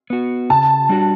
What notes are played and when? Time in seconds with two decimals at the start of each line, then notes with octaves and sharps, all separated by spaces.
0.10 B3 F#4
0.50 C#3 A5
0.89 G3 D4 F#4